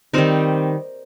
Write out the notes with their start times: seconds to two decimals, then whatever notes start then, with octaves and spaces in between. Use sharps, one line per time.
0.13 D#3 G3 C4 D#4